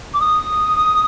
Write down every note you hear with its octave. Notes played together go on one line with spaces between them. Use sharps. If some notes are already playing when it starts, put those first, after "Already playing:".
D6
D#6